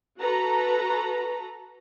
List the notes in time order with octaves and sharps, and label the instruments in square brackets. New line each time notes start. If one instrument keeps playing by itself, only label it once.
[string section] F#4 A4 B4 A#5